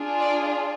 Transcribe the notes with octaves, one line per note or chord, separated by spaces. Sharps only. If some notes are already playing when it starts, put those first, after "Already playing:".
Already playing: D4 F4 G#4
D5